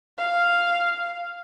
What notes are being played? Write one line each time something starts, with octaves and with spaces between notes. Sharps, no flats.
F5